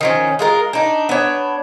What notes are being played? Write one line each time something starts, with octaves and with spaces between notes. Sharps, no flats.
D#3 F3 C#4
G#3 F4 A#4
D4 D#4
B3 D4 C#5